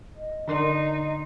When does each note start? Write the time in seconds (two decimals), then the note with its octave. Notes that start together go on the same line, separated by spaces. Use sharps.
0.16 D#5
0.48 D3 D4 D#4 A#4 D5 C6 C7